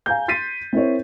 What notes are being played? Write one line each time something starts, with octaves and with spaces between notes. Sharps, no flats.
F5 G#5 A#5 G6
C6 A6 B6 C7 D#7
C4 E4 A#4 C#5